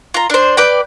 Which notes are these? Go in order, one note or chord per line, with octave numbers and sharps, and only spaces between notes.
F4 A#5
D4 C5
B4 D5 G5